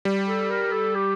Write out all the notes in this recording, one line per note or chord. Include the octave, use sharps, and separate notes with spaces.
G3
A4
A#4
A4
G4